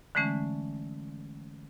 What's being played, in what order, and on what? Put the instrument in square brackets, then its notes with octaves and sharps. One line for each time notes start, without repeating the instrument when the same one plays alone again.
[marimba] D3 E3 G#3 A3 C#4